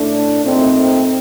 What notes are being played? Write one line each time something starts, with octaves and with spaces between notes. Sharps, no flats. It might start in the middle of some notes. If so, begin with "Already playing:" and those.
Already playing: A2 A3 D4
A#2 A3 C4 D#4